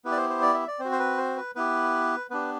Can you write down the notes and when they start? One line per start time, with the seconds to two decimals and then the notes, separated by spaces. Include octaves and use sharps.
0.05 B3 E4 G4 B4
0.12 D5
0.17 C5
0.30 C5
0.42 D5
0.54 E5
0.68 D5
0.79 C4 C5
0.85 F#4
0.92 C5
0.99 B4
1.17 C5
1.37 B4
1.55 B3 E4 G4 B4
2.30 B3 D4 G4 B4